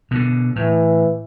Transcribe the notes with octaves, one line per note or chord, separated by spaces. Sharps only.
B2 D3
A2 E3